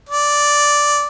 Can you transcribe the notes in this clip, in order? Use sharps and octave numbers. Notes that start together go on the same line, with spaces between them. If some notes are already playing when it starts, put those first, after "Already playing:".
D5